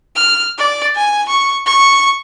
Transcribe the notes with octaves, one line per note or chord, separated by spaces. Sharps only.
F6
D5
G#5
C#6
C#6